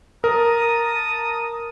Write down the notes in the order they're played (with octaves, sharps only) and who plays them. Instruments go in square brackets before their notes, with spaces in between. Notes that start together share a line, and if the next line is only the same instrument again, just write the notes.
[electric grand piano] A#4 [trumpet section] A5 A#5 D#6